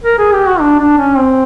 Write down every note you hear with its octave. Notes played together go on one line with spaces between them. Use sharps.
A#4
G#4
G4
F#4
D4
D4
C#4
C4